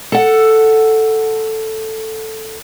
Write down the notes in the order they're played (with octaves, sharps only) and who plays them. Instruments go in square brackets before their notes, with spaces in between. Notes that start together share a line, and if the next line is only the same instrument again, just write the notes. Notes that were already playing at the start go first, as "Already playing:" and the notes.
[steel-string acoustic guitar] A4 F#5